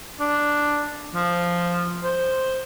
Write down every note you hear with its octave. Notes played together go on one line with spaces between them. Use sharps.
D4
F3
C5